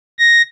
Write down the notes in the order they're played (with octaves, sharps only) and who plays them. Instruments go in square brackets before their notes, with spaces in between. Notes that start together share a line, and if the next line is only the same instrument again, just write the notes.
[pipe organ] A#6